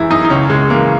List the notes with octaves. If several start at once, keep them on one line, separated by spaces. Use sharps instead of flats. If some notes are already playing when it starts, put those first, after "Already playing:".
Already playing: F#2 E3 G#3 E4
F#2 D#4
D#4
C#2 C#4
C#2 G#3
E3 A#3